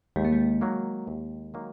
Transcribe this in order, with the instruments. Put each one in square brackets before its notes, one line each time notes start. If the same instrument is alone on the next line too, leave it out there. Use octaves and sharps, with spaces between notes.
[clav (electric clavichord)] D#2 [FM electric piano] G#3
[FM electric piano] A#3
G#3
[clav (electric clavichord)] D#3 F#3 A#3
D#2
D#3 F#3 A#3